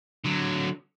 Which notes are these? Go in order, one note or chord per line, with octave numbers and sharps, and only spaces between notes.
D3 F#3